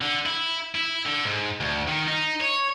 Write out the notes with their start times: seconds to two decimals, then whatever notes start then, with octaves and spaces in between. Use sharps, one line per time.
0.01 D3
0.26 E4
0.75 E4
1.06 D3
1.25 G#2
1.60 D2
1.88 D#3
2.08 D#4
2.41 C#5